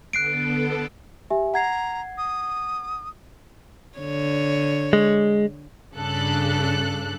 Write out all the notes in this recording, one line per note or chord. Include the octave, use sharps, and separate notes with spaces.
D3 B3 A4 F#6 C7 D7
G4 E5 G#5
F#5 A#5 G#6 C7
D#6
D3 C#5
G#3
G2 C#3 D4 A4 F#6